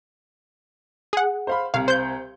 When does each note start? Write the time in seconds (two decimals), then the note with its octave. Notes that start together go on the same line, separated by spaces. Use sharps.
1.13 G#4 F#5
1.47 C5 F5 B5
1.74 C2 F5
1.88 C5 G6